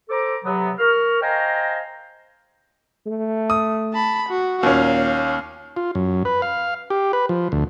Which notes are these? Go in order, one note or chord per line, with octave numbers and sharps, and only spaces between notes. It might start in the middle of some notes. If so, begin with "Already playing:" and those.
A4 C5 A#5 D6
C3 F#3 B3
A#4 C#6 F6
C5 D#5 F5 G5 G#5 A#5
A3
D#6
A5 B5
F#4
D#2 A#2 C#4 F5
F4
F#2
B4
F5
G4
B4
F3
D2